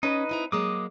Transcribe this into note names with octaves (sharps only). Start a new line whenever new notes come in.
C#4 D#4 B4 D#5
C4 E4 A#5
F#3 G#3 A#3 D6 D#6